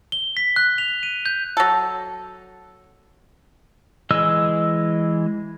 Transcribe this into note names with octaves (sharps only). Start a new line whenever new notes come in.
G7
B6
F#6
F7
D#7
G6
F#3 A4
E3 G#3 D#5 E6